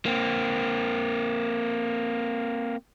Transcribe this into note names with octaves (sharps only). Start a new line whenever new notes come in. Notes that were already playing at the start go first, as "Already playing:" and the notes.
A#3 C4